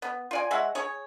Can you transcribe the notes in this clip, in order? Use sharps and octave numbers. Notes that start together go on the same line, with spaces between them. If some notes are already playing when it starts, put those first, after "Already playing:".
B3
F4 D5 G#5
G#3 C#5 E5 F#5
G#4 C#5